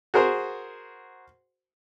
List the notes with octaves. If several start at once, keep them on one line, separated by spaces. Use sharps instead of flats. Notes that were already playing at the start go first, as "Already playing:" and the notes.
F#4 G#4 A#4 C5